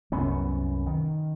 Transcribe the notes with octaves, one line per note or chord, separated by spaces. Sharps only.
C2 F#2 B3 C#4
D#3